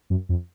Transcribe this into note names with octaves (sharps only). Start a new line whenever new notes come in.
F#2
F2